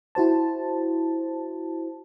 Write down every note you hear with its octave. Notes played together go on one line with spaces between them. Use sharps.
E4 F#4 C5 A5